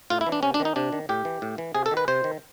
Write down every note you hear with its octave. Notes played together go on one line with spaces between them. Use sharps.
A2 F4
E4
E3
D4
C3 C#4
D4
D#3
D#4
C3 D4
D#3
A2 G4
E3
A2
E3
C3 G#4
A4
D#3
B4
C3 C5
D#3